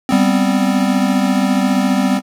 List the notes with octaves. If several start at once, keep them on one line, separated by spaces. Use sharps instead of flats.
G3 B3 C4